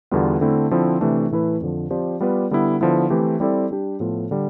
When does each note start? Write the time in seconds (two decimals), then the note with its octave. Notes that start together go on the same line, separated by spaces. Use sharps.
0.11 E2 D3 G3 B3 F4
0.41 D3 A3 C4 E4
0.71 D3 F3 C4 E4
1.01 C3 E3 A3 D4
1.31 A2 E3 A3 E4 B4
1.61 F2 D3 F3
1.90 F3 C4 G4 D5
2.21 G3 B3 F4 B4 D5
2.51 D3 G3 B3 E4
2.81 D3 F3 B3 E4
3.10 E3 A3 C4 G4
3.40 G3 C4 E4 A4 D5
3.71 G3 D4 G4
4.00 A2 F3 B3 F4 A4
4.31 D3 G3